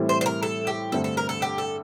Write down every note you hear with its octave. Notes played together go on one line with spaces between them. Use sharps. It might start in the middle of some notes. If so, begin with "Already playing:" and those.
Already playing: A2 E3 G3 C4 E4
C5
C5
A#4
A4
G4
G2 D3 A3 C4 A4
A4
A#4
A4
G4
A4